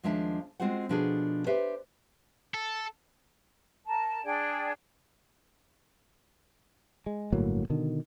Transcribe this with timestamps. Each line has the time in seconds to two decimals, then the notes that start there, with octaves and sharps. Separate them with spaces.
0.03 D#2 F3 G#3 D4 E5 A5
0.60 G#3 C4 F4 F#4 C5 F#5
0.89 B2 F3 D4 F#4 G#4 A4
1.46 G4 B4 C5 D5 E5
2.54 A4
3.86 A#4 A5
4.23 D4 G#4 D5 G5
7.06 G#3
7.33 G1 A2 F#3 A#3
7.70 B2 D3 D#3